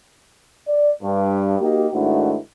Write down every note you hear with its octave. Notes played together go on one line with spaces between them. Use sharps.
D5
G2
A#3 D#4 F#4 G4
G#2 D#3 A3 D4 E4 F#4